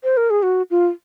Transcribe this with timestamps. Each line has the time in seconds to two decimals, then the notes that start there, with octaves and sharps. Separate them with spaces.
0.04 C5
0.17 A#4
0.30 G#4
0.43 F#4
0.71 F4